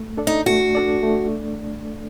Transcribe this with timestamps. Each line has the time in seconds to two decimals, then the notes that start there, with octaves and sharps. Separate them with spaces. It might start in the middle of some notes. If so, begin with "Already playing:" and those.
Already playing: A3
0.17 D4 A4 D5
0.27 D#4
0.46 A3 F#4
0.75 D4 A4 D5
1.03 A3